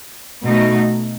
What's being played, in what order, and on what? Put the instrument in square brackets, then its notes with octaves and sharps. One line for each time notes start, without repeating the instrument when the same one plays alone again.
[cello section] B2 A3 D#4